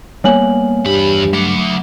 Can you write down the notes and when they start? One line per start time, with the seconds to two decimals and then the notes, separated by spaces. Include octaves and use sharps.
0.24 G3 A#3 B3 C#5 G#5 F#7
0.86 E2 G2 G4 B5
1.33 F#3 A3 F#5 B5 D6